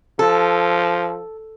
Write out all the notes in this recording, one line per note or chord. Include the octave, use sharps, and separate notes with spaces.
F3 A4